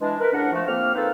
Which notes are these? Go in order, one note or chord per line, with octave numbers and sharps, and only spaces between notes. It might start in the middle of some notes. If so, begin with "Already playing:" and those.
E3 G#3 D4
A#4 B4
C#2 A2 D4 A#4 F#5
F3 A3
F2 A#3 F6
A#3 C4 D#4 A4 B4 C5